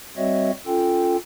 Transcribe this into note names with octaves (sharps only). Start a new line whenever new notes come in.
G3 C4 F#4 C#5 D#5 E5
C#4 F4 A4 G5